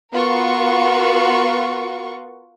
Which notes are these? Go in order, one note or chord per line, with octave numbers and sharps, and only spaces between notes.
B3 F4 F#4 A#4 C#6